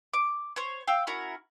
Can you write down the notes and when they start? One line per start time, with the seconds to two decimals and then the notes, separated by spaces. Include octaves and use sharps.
0.14 D6
0.56 C5 C#5
0.87 F5 G5 E6
1.07 C#4 E4 F#4 A#4